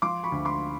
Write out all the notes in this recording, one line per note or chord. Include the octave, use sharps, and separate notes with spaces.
F3 C6 D6
B5 C#6
D2
C6 D6